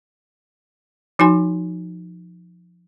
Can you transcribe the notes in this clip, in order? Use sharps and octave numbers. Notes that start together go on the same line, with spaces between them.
F3 D#4 F#4 G#5 C6